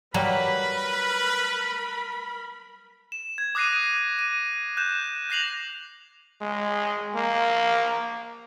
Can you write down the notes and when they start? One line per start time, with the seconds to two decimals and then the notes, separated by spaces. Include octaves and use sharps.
0.14 F#3 G3 A#3 A#4 B4 B5
3.12 E7
3.38 G#6
3.55 D6 D#6 F#6 A#6 C7 D#7
4.19 D#7
4.77 F#6 G6 E7
5.30 F#6 A#6 C7 F7 F#7
6.41 G#3
7.15 A#3